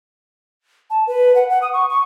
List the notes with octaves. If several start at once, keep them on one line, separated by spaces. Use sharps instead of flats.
A5
B4
F#5
F#5
D#6
C#6
C#6